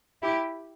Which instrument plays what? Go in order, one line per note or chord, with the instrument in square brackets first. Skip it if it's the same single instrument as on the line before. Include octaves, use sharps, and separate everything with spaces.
[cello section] E4 G4